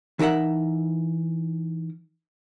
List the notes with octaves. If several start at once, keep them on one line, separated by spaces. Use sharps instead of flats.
E3 D#4 A#4 E5 F#5